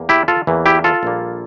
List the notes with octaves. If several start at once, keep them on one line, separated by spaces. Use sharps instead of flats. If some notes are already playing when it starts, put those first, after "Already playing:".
Already playing: E2 E3 A#3
E4 G4
F4 A4
E2 E3 A#3
E4 G4
F4 A4
A#1 A#2 G3 A#3